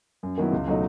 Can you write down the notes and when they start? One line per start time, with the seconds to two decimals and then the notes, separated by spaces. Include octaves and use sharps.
0.23 F#2
0.37 D#3 F#3 B3 E4
0.52 C#2
0.67 B2 F#3 A3 D#4